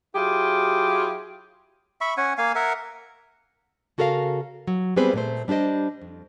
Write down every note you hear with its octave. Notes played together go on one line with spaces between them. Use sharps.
F#3 E4 F4 G4 G#4
E5 B5 C#6
C#4 F#5 G#5
A#3 F5 G#5
A#4 E5 F#5
C#3 F#4 A4 A#4 E5 F5
F#3
G3 B3 C4 G#4 B4 C5
A#2 A3 C5
G3 D4 G4 C5 D#5
F2